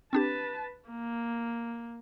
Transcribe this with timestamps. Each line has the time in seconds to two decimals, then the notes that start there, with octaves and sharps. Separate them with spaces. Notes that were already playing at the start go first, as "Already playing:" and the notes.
0.13 C4 D4 G4 B4 A5
0.88 A#3